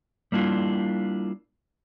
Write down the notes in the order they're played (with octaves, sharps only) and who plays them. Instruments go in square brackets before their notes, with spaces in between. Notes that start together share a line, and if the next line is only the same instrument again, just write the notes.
[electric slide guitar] G3 A#3 D4 E4 F4